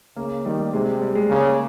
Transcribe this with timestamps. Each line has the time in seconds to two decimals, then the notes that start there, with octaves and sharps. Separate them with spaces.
0.16 C#3 A#3
0.45 D#3 G3
0.60 G3
0.73 C3 G#3
1.02 G3
1.15 G#3
1.29 C#3 A#3